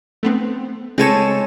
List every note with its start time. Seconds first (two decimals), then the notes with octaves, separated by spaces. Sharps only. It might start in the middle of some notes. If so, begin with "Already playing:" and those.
0.23 A3 B3 C4
0.98 G#3 C4 A4 C#5 D#7 E7